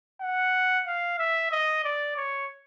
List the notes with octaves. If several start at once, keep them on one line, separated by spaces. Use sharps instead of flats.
F#5
F5
E5
D#5
D5
C#5